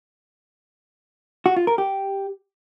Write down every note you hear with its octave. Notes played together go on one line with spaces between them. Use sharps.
F#4
F4
A#4
G4